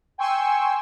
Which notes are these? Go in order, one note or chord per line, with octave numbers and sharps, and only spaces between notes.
G5 G#5 C6 C#6 E6